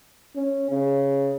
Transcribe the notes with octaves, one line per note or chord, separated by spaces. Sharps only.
C#4
C#3